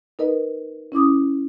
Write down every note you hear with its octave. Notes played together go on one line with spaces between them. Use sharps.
D#4 A#4 B4 D#5
C#4 E4 D6 D#6